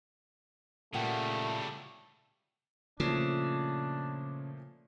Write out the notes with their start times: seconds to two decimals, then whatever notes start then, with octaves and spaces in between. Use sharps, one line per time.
0.94 A#2 C#3 G3 A3 F#5 G5
3.00 A#2 C#3 F3 A3 D4